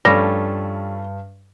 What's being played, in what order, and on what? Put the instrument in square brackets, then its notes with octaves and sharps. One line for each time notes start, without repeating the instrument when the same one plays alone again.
[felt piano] G2 [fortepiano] F3 A3 C#4 [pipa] G3 [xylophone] A#6